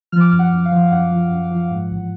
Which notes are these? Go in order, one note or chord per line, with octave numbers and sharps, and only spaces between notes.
F3 F6
D6
F6
F#2
F#5
F#2
F5
F3
F#2 F#5
F3
F#2
F3
G#2
A1